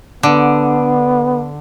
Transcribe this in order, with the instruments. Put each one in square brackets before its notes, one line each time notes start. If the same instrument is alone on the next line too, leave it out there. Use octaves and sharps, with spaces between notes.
[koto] D3 [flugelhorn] B3